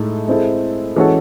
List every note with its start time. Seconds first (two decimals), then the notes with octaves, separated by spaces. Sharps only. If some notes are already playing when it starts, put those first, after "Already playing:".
Already playing: A2 G#3 D#4 A4
0.28 G#3 C4 E4 A4
0.96 E3 G#3 C#4 F#4 A4